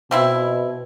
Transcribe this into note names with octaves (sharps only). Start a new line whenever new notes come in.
B2 F3 C4 E4